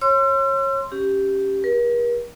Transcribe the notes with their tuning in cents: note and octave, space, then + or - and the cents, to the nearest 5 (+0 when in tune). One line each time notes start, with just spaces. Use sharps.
C#5 -25 C6 +0 E6 +45
C#4 +5 G4 +0
G4 +45 A#4 +45